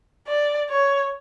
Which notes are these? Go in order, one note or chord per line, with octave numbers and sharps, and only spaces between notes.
D5
C#5